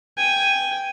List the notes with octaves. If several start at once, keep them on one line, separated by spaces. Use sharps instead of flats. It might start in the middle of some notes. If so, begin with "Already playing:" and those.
G5 G#5